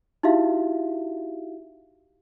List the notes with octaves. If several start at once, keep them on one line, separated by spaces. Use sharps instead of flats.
D#4 E4 F#4 G4 E5 F5